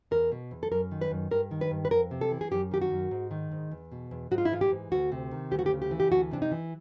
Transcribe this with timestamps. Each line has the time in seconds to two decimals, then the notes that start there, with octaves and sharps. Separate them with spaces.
0.11 E2 A#4
0.32 B2
0.51 E2
0.63 A4
0.71 F#2 A#4
0.91 D#3
1.01 B4
1.11 F#2
1.31 G2 A#4
1.51 D#3
1.61 B4
1.71 G2
1.85 B4
1.91 F2 A#4
2.11 C3
2.21 A4
2.31 E3
2.41 G#4
2.51 F#2 G4
2.71 D#3 G4
2.82 F#4
2.91 F#2
3.11 G#2
3.31 D#3
3.51 G#2
3.71 E2
3.92 B2
4.11 E2
4.31 G#2 F#4
4.38 F4
4.45 E4
4.52 E3 F4
4.61 G4
4.71 G#2
4.91 D2 F#4
5.12 C3
5.31 D#3
5.51 D2 G4
5.59 F#4
5.66 G4
5.71 C#3
5.82 G4
5.91 E3
6.00 G4
6.11 D2 F#4
6.31 C3 D4
6.42 D#4
6.51 E3